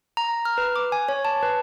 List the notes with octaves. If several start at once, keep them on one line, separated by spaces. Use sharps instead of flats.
A#5
F6
B4
D6
G#5
C#5
A5
B4